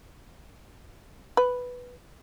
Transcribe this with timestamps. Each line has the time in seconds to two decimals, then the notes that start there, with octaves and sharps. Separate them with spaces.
1.37 B4